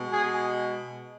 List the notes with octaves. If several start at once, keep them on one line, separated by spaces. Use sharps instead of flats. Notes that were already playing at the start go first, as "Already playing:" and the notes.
Already playing: B2 G#3
G#4